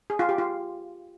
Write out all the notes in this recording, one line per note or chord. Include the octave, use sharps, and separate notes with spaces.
G#4
F4
G4
F4